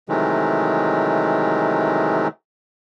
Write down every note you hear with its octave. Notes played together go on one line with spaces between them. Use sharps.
C3 D#3 E3 F#3 G#3 A3